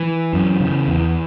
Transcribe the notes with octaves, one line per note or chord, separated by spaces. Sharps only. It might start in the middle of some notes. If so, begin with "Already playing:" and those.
Already playing: E3
F#2
C#3
E2